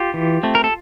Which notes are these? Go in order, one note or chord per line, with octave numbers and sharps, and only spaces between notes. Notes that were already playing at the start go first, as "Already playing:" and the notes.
Already playing: F4 G4
E3
A3 C4
A#4
A4